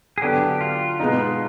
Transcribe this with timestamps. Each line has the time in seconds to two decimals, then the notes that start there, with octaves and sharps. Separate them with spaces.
0.18 G#4
0.22 D3 F#3 B3 D4 G4
0.61 F4
1.00 B2 G#3 B3 D#4